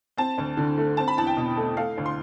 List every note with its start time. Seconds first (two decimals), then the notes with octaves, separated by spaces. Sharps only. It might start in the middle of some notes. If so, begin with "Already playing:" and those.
0.18 C4 A5
0.38 D2
0.57 D3
0.78 A3
0.97 C4 A5
1.08 B5
1.17 E2 A5
1.27 G5
1.37 B2
1.57 A3
1.77 A3 F5
1.98 D2
2.06 C6